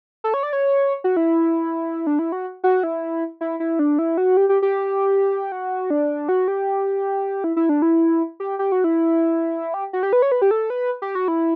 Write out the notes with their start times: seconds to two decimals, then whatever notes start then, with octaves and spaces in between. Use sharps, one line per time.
0.24 A4
0.34 C#5
0.43 D5
0.53 C#5
1.04 F#4
1.17 E4
2.07 D4
2.19 E4
2.32 F#4
2.64 F#4
2.83 E4
3.41 E4
3.60 E4
3.79 D4
3.99 E4
4.17 F#4
4.37 G4
4.49 G4
4.62 G4
5.52 F#4
5.90 D4
6.29 F#4
6.48 G4
7.44 E4
7.56 E4
7.69 D4
7.82 E4
8.40 G4
8.59 G4
8.72 F#4
8.84 E4
9.74 G4
9.93 F#4
10.03 G4
10.13 B4
10.22 C#5
10.32 B4
10.41 G4
10.51 A4
10.70 B4
11.02 G4
11.15 F#4
11.28 E4